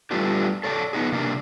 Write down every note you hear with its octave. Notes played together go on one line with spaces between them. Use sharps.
G3 A3 B3 D4 F4 G4
A4 C#5 D5 F#5 A5
B3 D#4 G#4
C3 A#3 D4